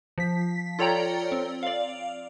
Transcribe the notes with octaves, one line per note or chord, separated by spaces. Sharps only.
F3 B6
F4 A4 C#5 D5 G5 A#5
C4
D5 F5